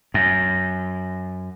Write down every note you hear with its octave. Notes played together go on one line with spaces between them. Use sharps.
F#2